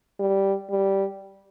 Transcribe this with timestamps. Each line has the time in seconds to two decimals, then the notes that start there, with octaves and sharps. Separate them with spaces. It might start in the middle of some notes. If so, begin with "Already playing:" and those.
0.20 G3
0.71 G3